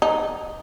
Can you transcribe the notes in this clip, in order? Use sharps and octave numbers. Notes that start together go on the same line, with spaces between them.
D#4